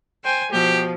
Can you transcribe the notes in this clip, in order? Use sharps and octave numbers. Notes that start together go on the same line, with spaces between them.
C5 G5 G#5
B2 F3 G4